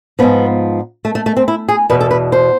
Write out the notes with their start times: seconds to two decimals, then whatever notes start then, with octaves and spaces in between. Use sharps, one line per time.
0.19 G#2 F3 B3
1.05 A3
1.15 A3
1.26 A3
1.37 C4
1.48 E4
1.69 G#4
1.90 E2 B2 B4
2.01 A4
2.11 B4
2.32 C5